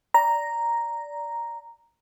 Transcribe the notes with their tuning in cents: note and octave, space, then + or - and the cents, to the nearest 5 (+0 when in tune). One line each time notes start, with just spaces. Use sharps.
D5 -10 A#5 +0